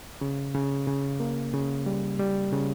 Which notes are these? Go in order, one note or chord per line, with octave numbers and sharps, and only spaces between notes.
C#3
C#3
C#3
A#3
C#3
G3
G3
C#3